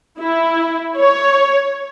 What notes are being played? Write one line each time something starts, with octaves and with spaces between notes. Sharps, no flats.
E4
C#5